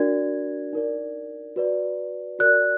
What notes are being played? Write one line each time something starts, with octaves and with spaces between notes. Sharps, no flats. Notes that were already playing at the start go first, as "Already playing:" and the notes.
Already playing: D4 F#4 A#4 D5 G#6
D#4 A#4 D5
F#4 B4 D5
F#4 A#4 D5 F#6